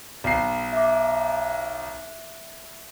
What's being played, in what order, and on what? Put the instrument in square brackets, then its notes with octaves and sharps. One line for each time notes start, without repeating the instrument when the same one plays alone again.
[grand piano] B1 C7
[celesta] E5 D6